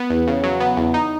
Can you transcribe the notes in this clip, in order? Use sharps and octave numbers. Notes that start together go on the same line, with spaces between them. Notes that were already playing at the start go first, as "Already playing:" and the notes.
Already playing: B3
E2
C#3
F#3
B3
E2
D#4